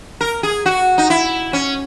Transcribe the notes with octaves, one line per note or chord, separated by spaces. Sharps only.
A#4
G#4
F#4
D#4
E4
C#4